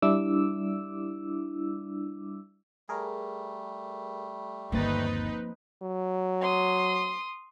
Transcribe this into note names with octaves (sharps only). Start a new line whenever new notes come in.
G3 D4 E4 D6 E6
G3 A3 G#4 A#4
G1 D#2 F3 A#3 C4 D#4 B4 A6
F#3
C6 D#6